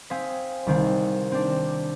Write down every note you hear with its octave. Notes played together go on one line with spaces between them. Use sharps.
C4 F5 G#5 D#6 B6
C2 D#3 C4
C4 D4